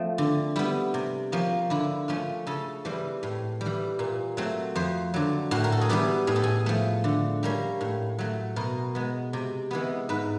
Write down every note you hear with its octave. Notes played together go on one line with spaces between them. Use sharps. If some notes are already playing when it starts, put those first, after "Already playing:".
Already playing: F3 A3 C4
D3
G3 B3 E4
C3
F3 A#3 C#4
D3 E4
F3 A3 C#4 F4
C#3 A4
E3 G3 C4
A2
G3
E3
A#2
F#3 A3 C4
F2 C5
D3 F#3
A2 F#4
A#4
A4
G#4
E3 G3 B3 G4
A2 G#4
A4
G#4
F3 A3
D3
G3 A#3 C#4
A2
F#3 A3
B2 A#4
G#3 B3
C3
E3 G#3 B3
G#2 B4